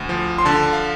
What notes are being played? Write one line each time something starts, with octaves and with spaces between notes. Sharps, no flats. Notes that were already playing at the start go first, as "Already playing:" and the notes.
Already playing: D2
F3
C6
D3 A5
F5